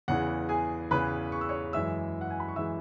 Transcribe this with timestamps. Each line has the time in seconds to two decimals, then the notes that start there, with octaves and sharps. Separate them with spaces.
0.08 E2 C#3 E3 F#5
0.49 G#4 G#5
0.91 E2 C#3 E3 B4 B5
1.32 C#6
1.41 E6
1.49 C#5 C#6
1.73 F#2 E3 G#3 E5 E6
2.21 F#5
2.30 G#5
2.40 B5
2.48 C#6
2.56 E3 G#3 E5 E6